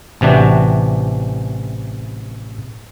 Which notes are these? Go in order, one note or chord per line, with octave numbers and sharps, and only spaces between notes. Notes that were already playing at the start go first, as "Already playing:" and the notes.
A1 C3 E3 D4 F#4